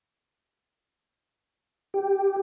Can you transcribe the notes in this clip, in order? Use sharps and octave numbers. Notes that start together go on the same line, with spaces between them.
G4